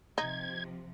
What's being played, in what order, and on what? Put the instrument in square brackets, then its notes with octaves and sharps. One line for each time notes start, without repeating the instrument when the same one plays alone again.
[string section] C3 F3 [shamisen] D#4 [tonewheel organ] G#6